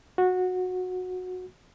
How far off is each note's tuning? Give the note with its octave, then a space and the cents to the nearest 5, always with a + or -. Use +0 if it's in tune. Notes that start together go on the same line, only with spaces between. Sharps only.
F#4 -15